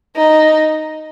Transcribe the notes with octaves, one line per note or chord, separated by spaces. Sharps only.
D#4